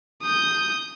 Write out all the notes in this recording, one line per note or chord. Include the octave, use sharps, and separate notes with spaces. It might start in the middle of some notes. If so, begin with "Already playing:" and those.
D#6 G6